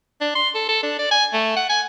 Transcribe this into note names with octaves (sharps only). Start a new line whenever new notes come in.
D4
C6
A4
A4
D4
D5
G#5
A3
F#5
G#5